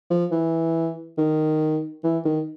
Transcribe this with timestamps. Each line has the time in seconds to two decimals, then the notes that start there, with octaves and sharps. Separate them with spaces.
0.10 F3
0.31 E3
1.18 D#3
2.04 E3
2.25 D#3